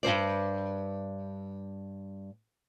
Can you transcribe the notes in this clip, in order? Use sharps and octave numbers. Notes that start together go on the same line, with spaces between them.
G2 D#3 C5 D5